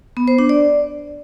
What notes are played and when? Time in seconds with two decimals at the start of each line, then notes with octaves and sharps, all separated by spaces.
0.17 B3
0.28 C5
0.38 D4
0.49 D5